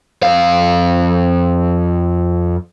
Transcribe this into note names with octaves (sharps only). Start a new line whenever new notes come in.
F2 F5